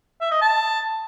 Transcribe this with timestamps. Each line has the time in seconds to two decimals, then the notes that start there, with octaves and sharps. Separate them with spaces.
0.21 E5
0.31 D#5
0.42 A5